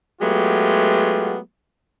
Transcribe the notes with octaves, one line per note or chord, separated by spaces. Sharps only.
F#3 G#3 A3 B3 F4 G4